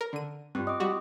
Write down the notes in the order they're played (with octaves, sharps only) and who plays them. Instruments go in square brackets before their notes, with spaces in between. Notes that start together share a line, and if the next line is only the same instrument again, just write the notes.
[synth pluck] A#4
D3 D#7
[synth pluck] G2 [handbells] C4 F4
[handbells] D#5 D6 [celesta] D#6
[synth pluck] G3 F#4